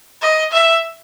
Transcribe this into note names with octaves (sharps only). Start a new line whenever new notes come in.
D#5
E5